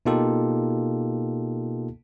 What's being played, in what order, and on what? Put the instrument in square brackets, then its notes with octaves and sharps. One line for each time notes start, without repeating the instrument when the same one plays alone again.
[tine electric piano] B2 A#3 D#4 F4 G4 A4